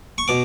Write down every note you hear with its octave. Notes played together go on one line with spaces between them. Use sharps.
C#6
B2 D6